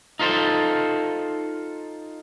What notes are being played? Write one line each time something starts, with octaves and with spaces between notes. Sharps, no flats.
D#4 F4 A4 C5